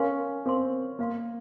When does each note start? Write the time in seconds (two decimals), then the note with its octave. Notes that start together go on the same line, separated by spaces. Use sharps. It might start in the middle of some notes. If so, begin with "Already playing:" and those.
Already playing: C#4 A#4 F5 C6
0.46 C4 A#4 F5 C6
0.99 A#3 A#4 F5 C6